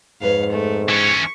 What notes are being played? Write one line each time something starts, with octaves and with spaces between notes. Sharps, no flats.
F2 G#2 B4 C#5 F5
A3
E3 C#4 C#6